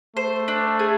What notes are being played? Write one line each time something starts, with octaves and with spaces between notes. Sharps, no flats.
A3 C5
D4
G#4